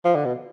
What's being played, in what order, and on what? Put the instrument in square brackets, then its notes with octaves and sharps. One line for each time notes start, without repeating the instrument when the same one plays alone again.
[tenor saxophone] F3
D3
B2